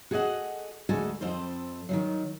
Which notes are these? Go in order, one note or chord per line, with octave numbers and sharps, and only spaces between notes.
F#4 G#4 A4 D5 D#5 F#5
D2 G#3 F#4 A4 G#5
F2 C4 A4 C5
D#3 F3 F#3